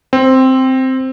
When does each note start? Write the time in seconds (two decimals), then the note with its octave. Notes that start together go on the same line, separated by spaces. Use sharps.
0.13 C4